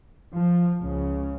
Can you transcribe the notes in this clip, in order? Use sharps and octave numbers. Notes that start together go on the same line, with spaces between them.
F3
C#2 C#3